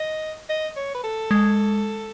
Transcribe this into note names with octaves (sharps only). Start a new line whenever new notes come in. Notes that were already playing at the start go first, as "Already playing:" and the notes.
Already playing: D#5
D#5
C#5
B4
A4
G#3